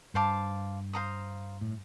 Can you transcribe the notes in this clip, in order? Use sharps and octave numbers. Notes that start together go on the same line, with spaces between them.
G2 C5 F5 A5 D6
C5 F5 A#5 D#6
A2